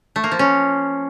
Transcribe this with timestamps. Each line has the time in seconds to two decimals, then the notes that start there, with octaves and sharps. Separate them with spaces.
0.16 A3
0.24 A#3
0.31 F3
0.39 C#4